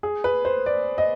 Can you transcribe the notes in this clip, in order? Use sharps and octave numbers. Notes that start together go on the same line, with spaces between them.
G#4
B4
C5
D5
D#5